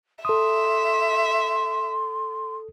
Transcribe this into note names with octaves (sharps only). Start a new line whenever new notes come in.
A4 E5 C6 D#6